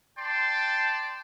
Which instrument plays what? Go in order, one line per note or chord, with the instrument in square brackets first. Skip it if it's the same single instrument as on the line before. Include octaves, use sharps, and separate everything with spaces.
[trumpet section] D5 G5 A5 C6